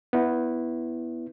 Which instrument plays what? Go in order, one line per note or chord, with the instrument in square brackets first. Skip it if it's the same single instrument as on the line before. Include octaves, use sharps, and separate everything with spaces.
[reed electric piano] B3 E4